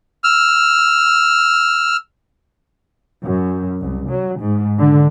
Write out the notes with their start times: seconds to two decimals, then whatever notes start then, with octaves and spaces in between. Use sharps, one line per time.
0.24 E6 F6
3.24 F#2
3.80 C2
4.09 F#3
4.40 G#2
4.78 D3